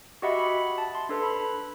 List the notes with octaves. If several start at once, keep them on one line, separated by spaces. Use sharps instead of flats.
F#4 G4 D#5 E5 F#5 B5
B5
A5
C6
D4 A4 B4
B5